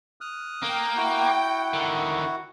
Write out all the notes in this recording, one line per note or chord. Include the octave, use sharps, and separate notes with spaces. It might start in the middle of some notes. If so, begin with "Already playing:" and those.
D#6 F6 F#6
A#3 G5
E4 F#4 F#5
D3 D#3